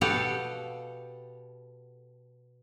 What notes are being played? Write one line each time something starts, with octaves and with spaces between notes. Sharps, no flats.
B2 G4 A4 F5 F#5